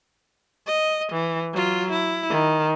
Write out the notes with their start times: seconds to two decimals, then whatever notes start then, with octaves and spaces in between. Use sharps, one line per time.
0.67 D#5
1.13 E3
1.54 F#3 F4
1.92 E4
2.30 D#3